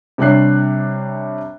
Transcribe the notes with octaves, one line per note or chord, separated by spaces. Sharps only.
C3 G3 D4 C#5 F#6 C7